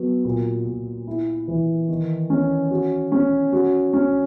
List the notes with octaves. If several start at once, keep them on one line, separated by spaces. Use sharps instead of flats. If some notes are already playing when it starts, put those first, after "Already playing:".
Already playing: F#3 B3
A#2
A#2
E4
E3
D#3
C#4
F#4
C#4
F#4
C#4